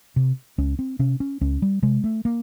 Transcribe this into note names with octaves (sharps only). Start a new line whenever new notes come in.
C3
C#2 C#4
C4
C3 C#4
C#4
C#2 C#4
G3
C3 G#3
A3
A#3